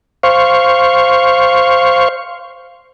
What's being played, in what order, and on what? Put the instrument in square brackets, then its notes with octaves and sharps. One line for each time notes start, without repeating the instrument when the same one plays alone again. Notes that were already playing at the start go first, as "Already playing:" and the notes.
[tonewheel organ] C5 F5 C#6